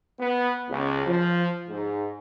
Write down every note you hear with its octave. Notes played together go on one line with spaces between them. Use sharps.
B3
C#2
F3
G#2